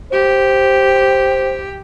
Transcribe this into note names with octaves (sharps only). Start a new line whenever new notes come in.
G4 C5